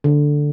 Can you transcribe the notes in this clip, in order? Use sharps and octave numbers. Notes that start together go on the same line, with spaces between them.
D3